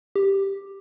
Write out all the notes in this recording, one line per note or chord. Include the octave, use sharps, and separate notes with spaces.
G4